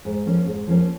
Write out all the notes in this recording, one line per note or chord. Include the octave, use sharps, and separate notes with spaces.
G#2
F3 A#3 C#4
G#2
F3 A#3 C#4